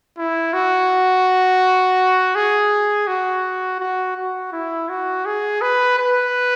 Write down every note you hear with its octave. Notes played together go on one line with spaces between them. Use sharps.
E4
F#4
G#4
F#4
F#4
F#4
E4
F#4
G#4
B4
B4